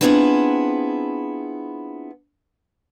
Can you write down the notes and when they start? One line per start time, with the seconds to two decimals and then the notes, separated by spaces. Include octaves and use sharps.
0.01 B3 C4 D4 E4 F4 G#4